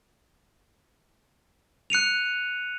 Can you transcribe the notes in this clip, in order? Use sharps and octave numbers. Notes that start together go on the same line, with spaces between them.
F#6 C#7 D#7 F7